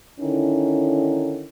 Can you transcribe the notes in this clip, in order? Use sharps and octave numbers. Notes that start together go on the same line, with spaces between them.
D3 D#3 C#4 D#4 E4